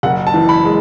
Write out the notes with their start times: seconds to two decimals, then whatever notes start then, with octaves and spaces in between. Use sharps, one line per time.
0.03 F#1 F#5
0.27 A5
0.34 E3
0.49 B5
0.65 G#3